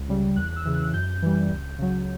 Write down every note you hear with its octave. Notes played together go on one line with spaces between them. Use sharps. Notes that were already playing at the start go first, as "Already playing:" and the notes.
Already playing: C#2
C#3 G3
E2 F#6
E6
C#3 E3
F#6
F#2 G6
E3 G3
C#2
C#3 F#3